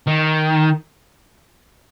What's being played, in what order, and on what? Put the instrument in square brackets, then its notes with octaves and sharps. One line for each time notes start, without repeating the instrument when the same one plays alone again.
[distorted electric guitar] D#3